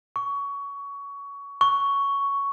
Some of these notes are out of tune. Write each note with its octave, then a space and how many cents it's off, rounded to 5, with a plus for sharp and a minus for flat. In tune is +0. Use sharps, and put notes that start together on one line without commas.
C#6 +20
C#6 +10